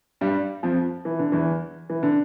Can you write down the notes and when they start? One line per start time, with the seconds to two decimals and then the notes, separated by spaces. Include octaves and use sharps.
0.21 G2 G3
0.63 F2 F3
1.05 E3
1.19 D3
1.32 E2 E3
1.90 E3
2.03 D3